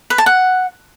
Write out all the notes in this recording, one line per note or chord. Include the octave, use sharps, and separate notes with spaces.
B4
A5
F#5